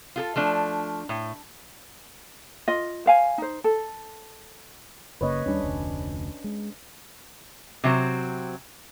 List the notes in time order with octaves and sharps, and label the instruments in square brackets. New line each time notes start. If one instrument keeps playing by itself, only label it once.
[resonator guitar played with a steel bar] F4 G#4 A4
F3 A3 D4
A2
[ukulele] F4 D#5
C5 F5 G#5
D#4 C5
A4
[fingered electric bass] F#1 C#3 A#3 [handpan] B4 C#5 D#5
[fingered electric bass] D#2 G3 [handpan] C#4 D4
[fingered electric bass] F1 D2
G#3
[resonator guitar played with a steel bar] C3 F#3 C4